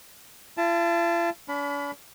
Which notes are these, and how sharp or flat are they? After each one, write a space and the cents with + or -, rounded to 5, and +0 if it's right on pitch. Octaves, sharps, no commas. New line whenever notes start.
F4 -45 A5 +0
D4 -45 B5 +10